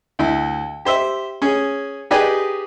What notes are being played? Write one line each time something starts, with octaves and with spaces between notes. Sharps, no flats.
D2 E4
G4 C5 E5
C#4 G#4
D#4 G4 G#4 B4 D5 G#5